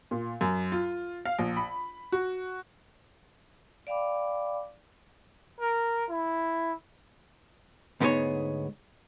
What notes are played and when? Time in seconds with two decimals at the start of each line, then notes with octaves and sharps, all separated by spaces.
0.11 A#2
0.41 F#2
0.72 F4
1.25 F5
1.39 A#1
1.57 B5
2.12 F#4
3.87 D5 F5 G5 B5 D6
5.60 A#4
6.10 E4
8.00 D2 G#2 B3 D#4 G#4 C#5